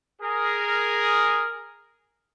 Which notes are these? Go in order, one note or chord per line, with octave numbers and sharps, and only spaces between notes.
G#4 A#4